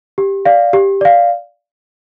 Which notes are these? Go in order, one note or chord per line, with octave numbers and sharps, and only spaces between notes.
G4
D5 F5
G4
D5 F5